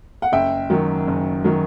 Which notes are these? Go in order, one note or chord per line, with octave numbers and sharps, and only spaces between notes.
F#5
F#1 E5 G5
F#2 D#3 F#3
F#1
D#3 F#3